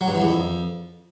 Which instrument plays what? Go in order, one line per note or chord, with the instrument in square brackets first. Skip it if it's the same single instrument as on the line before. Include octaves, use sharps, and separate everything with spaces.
[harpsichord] F#3
G2
E3
E2
F2